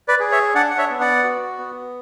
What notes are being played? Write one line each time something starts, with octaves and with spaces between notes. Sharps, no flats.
B4 D5
G#4
C#5 E5
D4 D5 F#5
F#5
C#5 E5
B3
D5 F#5
F#4
B3